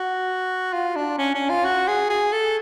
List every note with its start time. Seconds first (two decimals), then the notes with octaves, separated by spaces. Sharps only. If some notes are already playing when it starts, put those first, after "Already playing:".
Already playing: F#4
0.73 F4
0.96 D4
1.18 C#4
1.34 C#4
1.50 F4
1.65 F#4
1.88 G#4
2.10 G#4
2.32 A4